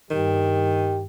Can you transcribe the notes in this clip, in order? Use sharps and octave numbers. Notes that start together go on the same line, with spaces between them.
G2 D#3 G4